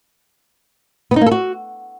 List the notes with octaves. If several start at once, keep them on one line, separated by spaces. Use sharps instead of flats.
B3
D#4
A#3
A4
F#4